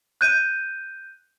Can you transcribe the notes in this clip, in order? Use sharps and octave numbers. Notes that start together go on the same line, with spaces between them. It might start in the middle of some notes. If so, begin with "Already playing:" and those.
F#6 G6 D#7